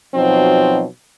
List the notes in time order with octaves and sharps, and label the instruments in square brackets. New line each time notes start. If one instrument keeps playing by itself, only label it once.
[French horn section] B2 F3 F#3 C4 D#4